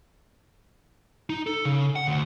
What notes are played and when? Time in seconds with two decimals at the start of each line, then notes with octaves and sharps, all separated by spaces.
1.30 D#4
1.47 A4
1.65 C#3
1.96 F#5
2.08 D2